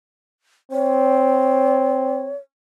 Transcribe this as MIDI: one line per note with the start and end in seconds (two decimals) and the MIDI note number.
0.72 2.31 60
0.72 2.36 73